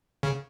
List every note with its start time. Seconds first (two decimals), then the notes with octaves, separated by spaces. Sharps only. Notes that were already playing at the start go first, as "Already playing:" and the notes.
0.23 C#3